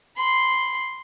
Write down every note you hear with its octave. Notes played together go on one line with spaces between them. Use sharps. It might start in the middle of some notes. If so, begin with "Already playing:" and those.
B5 C6